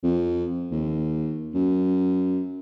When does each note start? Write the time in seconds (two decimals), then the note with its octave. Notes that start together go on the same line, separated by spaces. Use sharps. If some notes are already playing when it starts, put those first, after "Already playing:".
0.03 F2
0.72 D#2
1.55 F#2